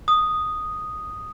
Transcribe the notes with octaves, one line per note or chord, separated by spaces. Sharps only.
D#6